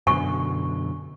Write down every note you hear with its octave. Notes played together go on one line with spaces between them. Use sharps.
F#2 B2 D3 G#5 C#6